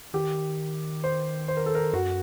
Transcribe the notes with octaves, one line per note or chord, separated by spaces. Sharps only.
D#3 G4
C5
C5
A#4
A4
A#4
F#2 F#4